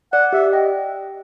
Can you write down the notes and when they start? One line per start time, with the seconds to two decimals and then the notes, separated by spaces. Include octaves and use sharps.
0.13 D5 F#5
0.33 G4 E5
0.52 D#5 G5